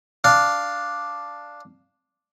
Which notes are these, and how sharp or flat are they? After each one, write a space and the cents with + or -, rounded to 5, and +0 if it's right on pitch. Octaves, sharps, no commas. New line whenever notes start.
D4 +0 F5 +0